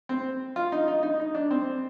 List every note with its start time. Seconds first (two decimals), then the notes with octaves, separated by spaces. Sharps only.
0.09 C4
0.56 F4
0.72 D#4
0.88 D#4
1.03 D#4
1.20 D#4
1.35 D4
1.51 C4